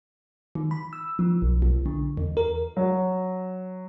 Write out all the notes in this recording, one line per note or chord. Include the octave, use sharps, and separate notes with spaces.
D#3
B5
E6
F3
B1
B1
D3
E2
A#4
F#3